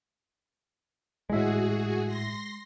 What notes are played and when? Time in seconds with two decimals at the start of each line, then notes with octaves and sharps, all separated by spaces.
1.30 G#1 A2 G#3 F#4 G#4 E5
2.06 C6 A#6